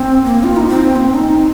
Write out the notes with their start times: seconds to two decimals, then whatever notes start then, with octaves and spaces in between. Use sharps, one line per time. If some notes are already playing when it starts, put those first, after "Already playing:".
Already playing: C4
0.24 A#3
0.43 F4
0.56 D#4
0.68 C4
0.96 A#3
1.05 C4
1.14 D#4